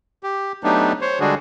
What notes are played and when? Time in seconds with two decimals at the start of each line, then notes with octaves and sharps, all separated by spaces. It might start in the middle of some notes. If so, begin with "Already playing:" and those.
0.23 G4
0.64 F#3 A3 B3 D4 D#4 G4
1.01 C5 C#5
1.20 D3 G3 G#3 D4 F#4 G#4